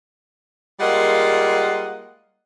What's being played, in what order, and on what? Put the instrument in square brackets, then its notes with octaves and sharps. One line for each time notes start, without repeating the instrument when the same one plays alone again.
[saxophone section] G3 G#3 A#3 F4 D#5 F#5